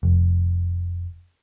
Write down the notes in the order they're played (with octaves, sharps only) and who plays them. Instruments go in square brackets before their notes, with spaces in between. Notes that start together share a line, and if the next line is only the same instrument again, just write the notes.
[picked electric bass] F1